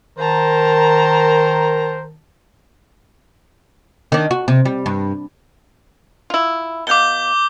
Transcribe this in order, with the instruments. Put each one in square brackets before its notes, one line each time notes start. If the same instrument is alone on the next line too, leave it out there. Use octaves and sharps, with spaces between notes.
[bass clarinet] D#3 [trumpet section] A#4 C5 [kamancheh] A5 A#5
[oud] D#3 D4
F#4
C3
G3
G2
[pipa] E4 F4
[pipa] B2 F5 [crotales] D6 G6 G7